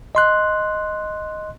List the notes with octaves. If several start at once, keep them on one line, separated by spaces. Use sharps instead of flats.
D#5 C6 F#6